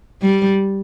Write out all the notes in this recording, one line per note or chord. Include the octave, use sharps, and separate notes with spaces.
G3